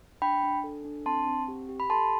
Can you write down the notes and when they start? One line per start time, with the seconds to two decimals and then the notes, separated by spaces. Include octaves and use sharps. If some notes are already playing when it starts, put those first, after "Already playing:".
0.22 D4 G5 B5
0.43 D4
0.64 A4
0.85 D4
1.06 C4 A5 C6
1.27 C4
1.48 G4
1.69 G4
1.80 B5
1.90 A4 A5 C6